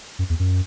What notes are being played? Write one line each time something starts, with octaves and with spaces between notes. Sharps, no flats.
F#2
E2
F#2